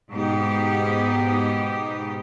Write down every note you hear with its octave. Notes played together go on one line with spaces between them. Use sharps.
G#2 B2 B3 D#4 G4